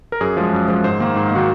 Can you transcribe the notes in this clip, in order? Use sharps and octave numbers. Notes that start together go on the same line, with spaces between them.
A#4
F#2 G#4
F3 G#3
F#2
F3 G#3
G#2 C5
D#3 A#3
G#2
D#3 A#3 F#4